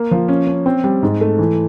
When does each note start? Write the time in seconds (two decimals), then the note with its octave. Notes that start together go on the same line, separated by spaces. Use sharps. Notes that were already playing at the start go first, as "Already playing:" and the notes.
Already playing: A#3
0.11 F3
0.28 C#4
0.47 C#4
0.66 C4
0.84 G3
1.03 G#2
1.21 A3
1.39 E3